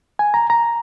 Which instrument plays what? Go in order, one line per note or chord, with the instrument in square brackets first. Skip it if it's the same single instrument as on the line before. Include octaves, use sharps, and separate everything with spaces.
[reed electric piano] G#5
A#5
A#5